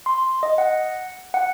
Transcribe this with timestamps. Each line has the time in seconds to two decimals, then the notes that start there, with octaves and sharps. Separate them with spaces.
0.06 C6
0.43 D#5
0.58 F#5
1.34 F#5